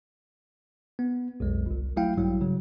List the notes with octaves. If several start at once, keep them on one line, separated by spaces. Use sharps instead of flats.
B3
B1 F2 G#3
G1 C2
F#3 A3 E4 F5 G5
A#1 G2 F#3 G3 E4
C#3 F#3